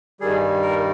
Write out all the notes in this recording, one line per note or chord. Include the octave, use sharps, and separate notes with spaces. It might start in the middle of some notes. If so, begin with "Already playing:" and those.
G2 D#3 G3 G#4
A#4